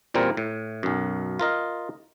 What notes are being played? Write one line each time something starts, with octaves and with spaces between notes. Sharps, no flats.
E2 A#2 G3 C4 A#4
A2
B1 F#2
F4 A#4 D#5 F5